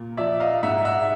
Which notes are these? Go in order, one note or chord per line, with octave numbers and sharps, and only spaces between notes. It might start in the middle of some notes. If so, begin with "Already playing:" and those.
Already playing: A#2
F3 D5 E5
D#5 F5
G#2 E5 F#5
E5 F#5